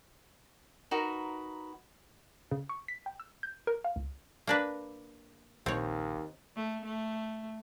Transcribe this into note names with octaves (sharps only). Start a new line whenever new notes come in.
D#4 F#4 A#4 B4
C#3
C#6
B6
G5
E6
G6
A#4
F5
C#2
A#3 D4 B4
A#1 D#2 C4 C#5
A3
A3